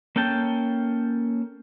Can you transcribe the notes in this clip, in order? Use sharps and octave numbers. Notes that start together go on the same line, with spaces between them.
A#3 C#4 A4 G5 A5